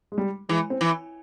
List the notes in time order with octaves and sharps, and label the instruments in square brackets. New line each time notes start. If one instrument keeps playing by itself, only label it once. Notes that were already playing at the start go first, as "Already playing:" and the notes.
[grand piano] G#3
G3
[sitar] E3 [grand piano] G#3
[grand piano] C4
[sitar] E3